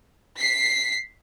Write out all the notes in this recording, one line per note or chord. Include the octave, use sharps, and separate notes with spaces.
B6 C7